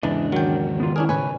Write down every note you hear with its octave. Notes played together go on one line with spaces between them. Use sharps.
E2 G#2 C#3 E3 D4 D#5
D#3 F#3 G5
B3 F4
C#4 D4 E4 G#4 A#4
A2 C#3 A3 B4 C#5 G#5